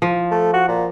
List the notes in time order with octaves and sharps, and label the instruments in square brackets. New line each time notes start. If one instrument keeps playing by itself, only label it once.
[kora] F3
[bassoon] A3
F#4
A#2